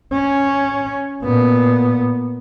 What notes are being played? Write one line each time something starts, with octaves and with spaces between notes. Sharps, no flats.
C#4
A#2 B3